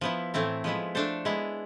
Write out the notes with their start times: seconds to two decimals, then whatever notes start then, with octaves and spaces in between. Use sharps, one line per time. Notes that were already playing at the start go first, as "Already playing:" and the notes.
0.01 F3 B3 E4
0.34 A2 E3 A3 C4 E4
0.64 F3 G#3 B3 E4
0.95 A3 D4 A4 C5
1.25 G#3 B3 E4